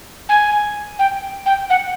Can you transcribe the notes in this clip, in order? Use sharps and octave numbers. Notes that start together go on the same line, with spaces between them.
G#5
G5
G5
F#5